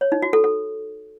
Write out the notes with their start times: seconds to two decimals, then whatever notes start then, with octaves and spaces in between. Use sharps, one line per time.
0.01 C#5
0.12 D#4
0.22 F#4
0.33 A4
0.44 A4